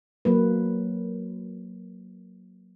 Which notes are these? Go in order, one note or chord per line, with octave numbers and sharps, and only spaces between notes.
F#3 A#3 B4